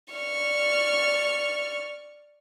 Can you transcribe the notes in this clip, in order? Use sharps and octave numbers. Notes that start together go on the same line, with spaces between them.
D5 C#6 F6